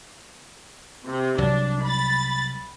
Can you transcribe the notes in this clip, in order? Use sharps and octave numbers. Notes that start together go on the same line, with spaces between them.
C3
C2 F#3 D4
B5 A6